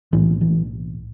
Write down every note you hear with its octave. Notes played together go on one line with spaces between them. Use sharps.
B1 A2 E3
E3